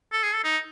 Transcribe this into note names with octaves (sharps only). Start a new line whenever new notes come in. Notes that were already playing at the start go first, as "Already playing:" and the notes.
A4
G#4
A4
D#4